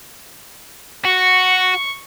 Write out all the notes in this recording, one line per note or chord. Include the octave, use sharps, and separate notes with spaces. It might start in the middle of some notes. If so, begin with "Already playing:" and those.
F#4 C#6